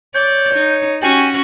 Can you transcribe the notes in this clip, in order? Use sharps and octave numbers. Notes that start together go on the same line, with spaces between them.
C#5 D5 G6
D#4
C#4 F#4 G4 G#5